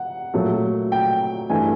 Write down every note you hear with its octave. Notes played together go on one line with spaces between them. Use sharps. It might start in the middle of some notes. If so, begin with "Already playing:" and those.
Already playing: F#5
A#2 F#3 A3
G5
G2 E3 A3 G#5